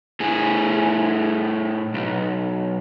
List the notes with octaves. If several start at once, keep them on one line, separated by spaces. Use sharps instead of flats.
A2 G#4
B1